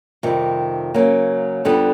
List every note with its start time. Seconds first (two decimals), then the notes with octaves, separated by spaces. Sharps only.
0.23 F2 C3 D#3 G3
0.94 C#3 F#3 A#3
1.65 F2 D3 G3 B3